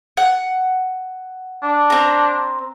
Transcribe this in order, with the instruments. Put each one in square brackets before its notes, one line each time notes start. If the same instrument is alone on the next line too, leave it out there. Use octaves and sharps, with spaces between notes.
[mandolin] F#5
[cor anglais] D4
[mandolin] C4 A#5